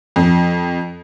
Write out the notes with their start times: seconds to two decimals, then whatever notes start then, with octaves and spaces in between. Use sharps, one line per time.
0.16 F2